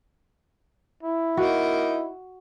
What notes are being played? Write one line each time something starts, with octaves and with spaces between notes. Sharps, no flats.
E4
A#3 D#4 F#4